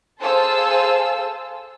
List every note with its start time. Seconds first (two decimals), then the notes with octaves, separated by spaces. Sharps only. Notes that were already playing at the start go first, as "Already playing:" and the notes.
0.21 G#4 A4 C5 F5 A5 E6